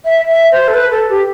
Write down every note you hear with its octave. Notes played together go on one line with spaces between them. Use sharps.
E5
E5
C5
A4
B4
A4
G4